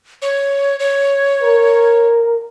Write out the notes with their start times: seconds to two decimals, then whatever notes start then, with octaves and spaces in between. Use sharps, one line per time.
0.22 C#5
0.80 C#5
1.42 A#4